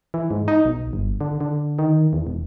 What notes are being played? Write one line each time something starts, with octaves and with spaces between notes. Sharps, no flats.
E3
G#2
D#4
B1
G1
D3
D3
D#3
E2
E1